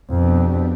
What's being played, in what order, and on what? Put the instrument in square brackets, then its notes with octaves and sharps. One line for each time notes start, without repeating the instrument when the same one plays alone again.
[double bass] F2 [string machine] B2 B3 D4 G4